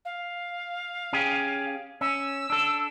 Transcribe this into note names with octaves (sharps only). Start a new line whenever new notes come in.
F5
C#4 G4 G#4
C#4 E6
D4 A4